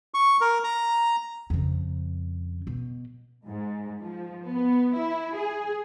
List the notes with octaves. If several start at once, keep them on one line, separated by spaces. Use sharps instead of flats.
C#6
A#4
A#5
F2 C#3
B2
G#2
F3
B3
E4
G#4